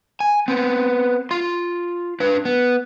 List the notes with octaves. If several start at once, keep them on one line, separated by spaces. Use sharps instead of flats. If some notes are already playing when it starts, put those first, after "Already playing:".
G#5
B3 C4
F4 C6
D4 B4
B3